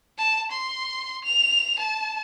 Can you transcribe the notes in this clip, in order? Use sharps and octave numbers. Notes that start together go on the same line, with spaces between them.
A5
C6
F7
A5